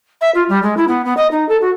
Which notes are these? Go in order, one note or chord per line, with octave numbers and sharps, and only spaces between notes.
E5
F4
G3
G#3
E4
B3
B3
D#5
D#4
A4
F#4